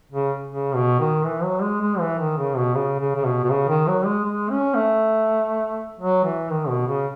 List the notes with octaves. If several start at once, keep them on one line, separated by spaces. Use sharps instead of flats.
C#3
C#3
B2
D#3
E3
F#3
G#3
G#3
E3
D#3
C#3
B2
C#3
C#3
C#3
B2
B2
C#3
D#3
F#3
G#3
G#3
C#4
A3
F#3
E3
D#3
B2
C#3